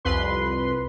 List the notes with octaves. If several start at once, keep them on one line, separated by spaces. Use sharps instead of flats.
C2 F2 B4 C6